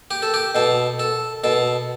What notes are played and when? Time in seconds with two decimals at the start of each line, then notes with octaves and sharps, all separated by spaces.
0.11 G4
0.22 A4
0.34 G4
0.55 B2 A4
0.99 A4
1.44 B2 A4